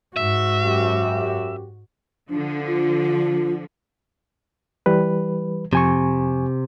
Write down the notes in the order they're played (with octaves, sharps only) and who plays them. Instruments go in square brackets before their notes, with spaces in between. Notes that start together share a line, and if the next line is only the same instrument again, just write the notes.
[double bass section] G#2 [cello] F#4 [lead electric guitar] E5
[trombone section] F#2 G4
[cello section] D3 F3 [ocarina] D4
[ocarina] F4
[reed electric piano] E3 G3 B4
[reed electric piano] F2 G#5 C#6 [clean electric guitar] C3